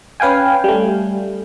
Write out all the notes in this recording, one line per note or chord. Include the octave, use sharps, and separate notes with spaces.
C#4 B4 F5 G5 G#5
G3 A3